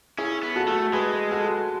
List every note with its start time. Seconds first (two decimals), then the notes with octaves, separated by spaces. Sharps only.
0.18 C#4 E4 G#4
0.43 B3
0.56 F#4 A4
0.68 A3
0.93 G#3 G#4 B4
1.31 F#4 A4